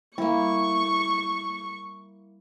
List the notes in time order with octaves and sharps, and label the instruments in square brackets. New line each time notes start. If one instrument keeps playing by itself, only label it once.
[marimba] G3 [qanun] A#3 E4 [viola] C#6